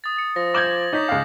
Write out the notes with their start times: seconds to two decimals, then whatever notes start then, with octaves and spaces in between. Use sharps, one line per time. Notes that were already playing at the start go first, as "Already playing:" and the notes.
0.04 D#6 A6
0.16 D#6 C#7
0.36 F3 A#6
0.54 D6 G6 G#6 A#6 E7 F#7
0.93 D#4 C#5 D6 G6 B6
1.08 C#2 F5